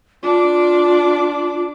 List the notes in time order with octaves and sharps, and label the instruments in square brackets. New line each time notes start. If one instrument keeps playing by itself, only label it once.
[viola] D4 D6 [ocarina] F4